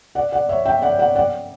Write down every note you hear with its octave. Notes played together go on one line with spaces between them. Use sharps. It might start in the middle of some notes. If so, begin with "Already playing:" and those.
D5 F#5
D5 F#5
C#5 E5
E5 G5
D5 F#5
D5 F#5
D5 F#5